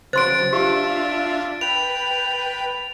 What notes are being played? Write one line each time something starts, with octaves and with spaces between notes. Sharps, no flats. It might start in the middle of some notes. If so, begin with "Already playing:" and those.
C#3 F#3 C5 C6 A6 D7
D4 F4 G4 E5
B4 G5 B5 F7